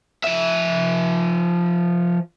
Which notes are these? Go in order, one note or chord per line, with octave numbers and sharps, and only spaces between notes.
F3 E5